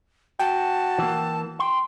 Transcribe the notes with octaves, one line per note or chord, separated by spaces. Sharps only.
F#4 G5 A5
E3 A#3
G5 C6